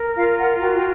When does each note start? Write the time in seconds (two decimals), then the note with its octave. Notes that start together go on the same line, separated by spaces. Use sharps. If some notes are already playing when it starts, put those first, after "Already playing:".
Already playing: A#4
0.15 F4 F5
0.38 F#5
0.60 F#4 G5
0.75 G5